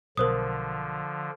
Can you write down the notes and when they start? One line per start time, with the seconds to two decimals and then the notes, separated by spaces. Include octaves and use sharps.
0.17 B1 B2 D3 F3 A#4 C5 D#6